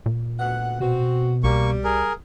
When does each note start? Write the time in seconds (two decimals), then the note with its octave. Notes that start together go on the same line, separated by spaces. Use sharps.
0.06 A#2
0.40 D2 B2 F#5
0.80 B2 C4 F#4
1.44 C2 G3 A#3 C#6
1.84 G#4 A#4